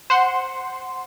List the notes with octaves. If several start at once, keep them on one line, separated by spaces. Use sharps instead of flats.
C5 F#5 C6